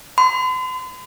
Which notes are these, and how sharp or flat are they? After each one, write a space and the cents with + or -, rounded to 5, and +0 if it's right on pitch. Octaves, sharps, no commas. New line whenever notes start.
C6 -45